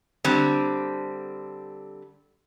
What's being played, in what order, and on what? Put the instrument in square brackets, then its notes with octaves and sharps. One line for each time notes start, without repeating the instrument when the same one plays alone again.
[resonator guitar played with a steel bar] D3 G3 C4